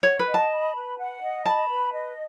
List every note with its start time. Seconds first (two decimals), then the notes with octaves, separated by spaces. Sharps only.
0.03 C#5 F#5
0.19 B4
0.26 D#5
0.34 A5
0.50 B5
0.75 B4
0.98 F#5
1.21 D#5
1.45 A5 B5
1.69 B4
1.92 D#5